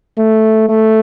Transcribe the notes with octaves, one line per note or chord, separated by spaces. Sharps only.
A3
A3